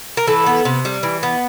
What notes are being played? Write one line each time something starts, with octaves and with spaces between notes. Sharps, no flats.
A#4
E3 A4 B4
B3
C3
G3
E3
B3